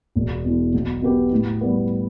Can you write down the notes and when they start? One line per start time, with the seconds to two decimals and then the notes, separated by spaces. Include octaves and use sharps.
0.16 E1
0.45 E2 E3
0.74 B1
1.02 B2 B3 G4
1.31 A2
1.61 G3 B3